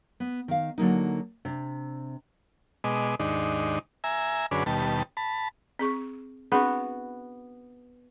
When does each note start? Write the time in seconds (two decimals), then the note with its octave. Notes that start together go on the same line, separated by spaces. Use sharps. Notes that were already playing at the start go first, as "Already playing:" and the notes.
0.20 B3
0.48 D#3 F5
0.78 D3 F#3 A#3 D#4
1.45 C3 D4
2.84 B2 G#3 D#5 D6
3.19 D#2 G#2 D4 D#4
4.04 E5 G#5 A#5
4.51 F#2 D3 C#4 G#4 B4 D6
4.66 D#2 B2 G3 A5
5.17 A5 B5
5.79 C4 G#4 C#6
6.52 B3 C4 D4 F#4 G#4